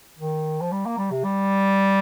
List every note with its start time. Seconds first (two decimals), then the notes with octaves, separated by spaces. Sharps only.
0.19 D#3
0.61 F3
0.72 G3
0.86 A#3
0.98 G3
1.11 C3
1.24 G3